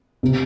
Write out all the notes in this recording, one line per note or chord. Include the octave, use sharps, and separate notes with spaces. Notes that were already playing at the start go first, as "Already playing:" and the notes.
C3